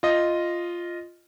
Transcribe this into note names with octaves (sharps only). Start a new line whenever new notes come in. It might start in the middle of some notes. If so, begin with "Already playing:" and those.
F4 D#5